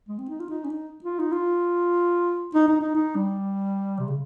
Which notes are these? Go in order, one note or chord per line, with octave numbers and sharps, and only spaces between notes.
G#3
C4
D#4
F4
D#4
C#4
D#4
F4
D#4
F4
D#4
D#4
D#4
D#4
G3
C3
C#3